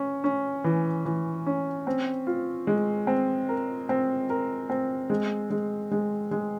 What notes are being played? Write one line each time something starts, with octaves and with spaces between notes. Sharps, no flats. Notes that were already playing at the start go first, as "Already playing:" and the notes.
Already playing: C#4
C#4
E3
E3
C#4
C4
F4
G#3
C4
A#4
C4
A#4
C4
G#3
G#3
G#3
G#3